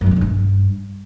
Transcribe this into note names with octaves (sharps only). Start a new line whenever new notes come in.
F#2
G2
C3
D3
G2